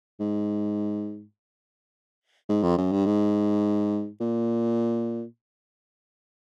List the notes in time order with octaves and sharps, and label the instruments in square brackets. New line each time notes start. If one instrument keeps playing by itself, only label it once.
[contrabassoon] G#2
G#2
F2
F#2
G2
G#2
A#2